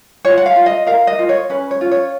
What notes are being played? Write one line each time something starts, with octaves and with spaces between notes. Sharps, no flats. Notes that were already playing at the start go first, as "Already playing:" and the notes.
F4 C#5
F#5
F5
F4
D#5
A#4 F5
D#5
F4
C#5
C#4 B4
C#5
F4
C#5